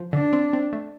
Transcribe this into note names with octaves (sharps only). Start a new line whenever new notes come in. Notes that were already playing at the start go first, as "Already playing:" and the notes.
Already playing: F3
D3 D4
C4
C4
A3